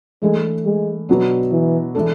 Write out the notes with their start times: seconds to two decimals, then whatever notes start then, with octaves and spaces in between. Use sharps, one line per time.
0.22 E3 G#3 A3 D4 A4
0.65 G#3
1.09 B2 F#3 B3 D4
1.52 E3
1.95 E3 G#3 D4 A4